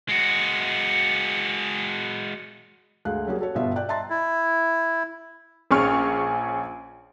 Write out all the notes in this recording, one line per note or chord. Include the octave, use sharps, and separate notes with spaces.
G#3 F#4
D2 G#3 F5 F#6
F#3 G3 A#3 C#4 F#4 G#4
F#4 A4 C#5
G1 B2 G3 F4 E5
D5 G5 F#6
D#5 E5 A5 A#5 C6 A6
E4
A#1 C#4 G#4 C#6 F6